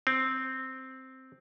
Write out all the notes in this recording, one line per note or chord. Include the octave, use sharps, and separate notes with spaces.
C4